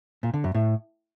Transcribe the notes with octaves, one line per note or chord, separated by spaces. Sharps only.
A#2
D3
F#2
A2